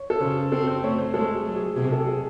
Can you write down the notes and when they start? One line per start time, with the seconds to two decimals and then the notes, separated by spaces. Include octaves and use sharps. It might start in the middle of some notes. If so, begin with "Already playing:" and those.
Already playing: C#5
0.10 A4
0.21 C#3 C5
0.52 C4 A4
0.67 C5
0.83 A3 C#5
0.98 C5
1.14 G#3 A4
1.35 G#4
1.45 F#3
1.56 G#4
1.76 C3 G#4
1.92 A4
2.07 G#4